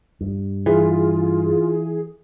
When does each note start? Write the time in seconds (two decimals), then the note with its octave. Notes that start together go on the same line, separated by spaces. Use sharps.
0.21 G2
0.66 E3 F4 G#4